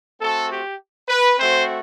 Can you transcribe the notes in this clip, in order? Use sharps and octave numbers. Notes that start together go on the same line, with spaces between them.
A3 C4 F#4 A4
G4
B4
A3 C4 F#4 C5